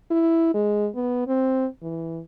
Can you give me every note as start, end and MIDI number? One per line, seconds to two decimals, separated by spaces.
0.11 0.54 64
0.54 0.88 56
0.95 1.25 59
1.27 1.66 60
1.83 2.21 52